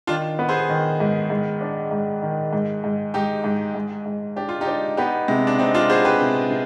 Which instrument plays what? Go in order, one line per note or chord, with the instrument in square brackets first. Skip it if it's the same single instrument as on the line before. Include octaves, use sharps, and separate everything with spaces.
[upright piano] D#3 [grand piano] D4 F4
[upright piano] B3
[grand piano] G#4 C5
[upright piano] D#3
G#2
G#2
D4
G#2
D#3
G#2
G#2
[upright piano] G#2 [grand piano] D#4 G4
[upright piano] G#2
G#2
G#2
[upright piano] D4 [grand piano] G4
[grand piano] F4
D#4 G4
[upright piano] D4
[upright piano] B3 [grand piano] D#4 G4
[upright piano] C3 [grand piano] G#3
[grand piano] D4
[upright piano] C3 [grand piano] C4 D#4
[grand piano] D4 F4
[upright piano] B3 [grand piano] G#4 C5
[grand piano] G4 B4
[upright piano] C3
C3